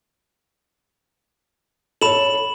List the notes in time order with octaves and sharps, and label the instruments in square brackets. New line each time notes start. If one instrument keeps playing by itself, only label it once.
[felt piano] A4 C#5 [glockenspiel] B5 E7 F#7